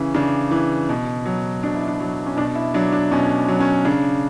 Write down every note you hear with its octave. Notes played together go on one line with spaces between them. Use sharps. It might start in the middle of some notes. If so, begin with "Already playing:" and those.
Already playing: C#3 E3 C#4
C#3 D4
E3
B2
F#3
B2 D4
E4
D4
F#3
C#4
B2 D4
E4
F#3 D4
D4
B2 C#4
F#3
C#4
C#3 D4